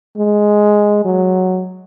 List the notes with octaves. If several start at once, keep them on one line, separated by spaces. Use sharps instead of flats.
G#3
F#3